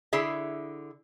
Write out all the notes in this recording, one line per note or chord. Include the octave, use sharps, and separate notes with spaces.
D3 E4 G#4 E5